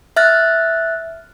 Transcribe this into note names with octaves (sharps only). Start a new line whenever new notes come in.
E5 F6 F#6 A6